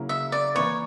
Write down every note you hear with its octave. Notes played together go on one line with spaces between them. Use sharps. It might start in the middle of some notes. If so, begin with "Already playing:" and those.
Already playing: C#3 F#3 A#3 E4
E5
D5
E3 A#3 E4 B4 C#5